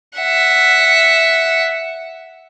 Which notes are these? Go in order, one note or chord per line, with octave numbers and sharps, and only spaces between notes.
E5 F#5